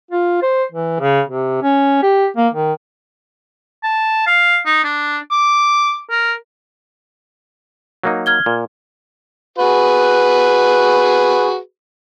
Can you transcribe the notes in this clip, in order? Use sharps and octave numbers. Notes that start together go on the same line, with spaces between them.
F4
C5
E3
C#3
C3
C#4
G4
A#3
D#3
A5
F5
D#4
D4
D6
A#4
F#3 A#3 D#4
F6 G#6 G7
A#2
F#4 G#4 B4